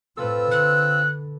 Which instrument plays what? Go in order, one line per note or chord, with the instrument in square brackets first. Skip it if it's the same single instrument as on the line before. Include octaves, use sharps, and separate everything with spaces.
[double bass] A2 [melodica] C4 F4 E6 [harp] A4 B4
[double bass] D3 [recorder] F#6